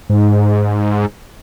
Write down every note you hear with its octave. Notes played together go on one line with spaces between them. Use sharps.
G#2